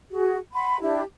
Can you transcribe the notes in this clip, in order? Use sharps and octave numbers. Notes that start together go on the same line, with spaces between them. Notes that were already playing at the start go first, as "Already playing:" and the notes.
F#4 G#4
F#5 B5 C6
D4 E4 G4